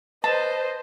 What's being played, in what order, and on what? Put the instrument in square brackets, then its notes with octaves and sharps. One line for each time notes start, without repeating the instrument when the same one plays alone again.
[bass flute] B4 [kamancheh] C5 D#5 [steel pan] A5